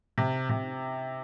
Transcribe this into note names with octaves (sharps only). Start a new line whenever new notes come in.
C3
C3